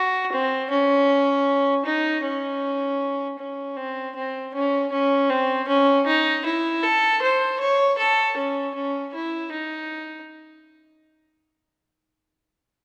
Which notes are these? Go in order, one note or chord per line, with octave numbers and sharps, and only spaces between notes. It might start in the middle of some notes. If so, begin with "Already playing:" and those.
Already playing: F#4
C4
C#4
D#4
C#4
C#4
C4
C4
C#4
C#4
C4
C#4
D#4
E4
A4
C5
C#5
A4
C#4
C#4
E4
D#4